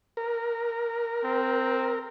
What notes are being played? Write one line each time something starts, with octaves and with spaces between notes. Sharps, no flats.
A#4
C4